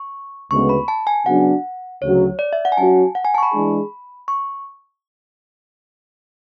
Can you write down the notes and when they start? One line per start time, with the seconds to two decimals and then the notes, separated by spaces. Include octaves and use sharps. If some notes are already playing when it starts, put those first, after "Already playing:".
Already playing: C#6
0.50 D2 C#3 G#3 B3 C#6
0.69 B5
0.88 A5
1.07 G#5
1.25 C#3 F#3 B3 D4 F#4 F#5
2.02 D2 C#3 F#3 C#5
2.39 D5
2.53 E5
2.65 F#5
2.72 G#5
2.77 F#3 C#4 F#4 A5
3.15 F#5
3.24 G#5
3.35 A5
3.38 C#6
3.43 B5
3.53 E3 G#3 D4 G#4
4.28 C#6